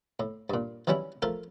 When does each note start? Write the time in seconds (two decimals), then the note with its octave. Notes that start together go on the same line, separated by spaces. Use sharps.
0.20 A2
0.50 G2 A#2
0.87 E3 F#3 G3 C#4 E4
1.22 F3 A3 A4 A#4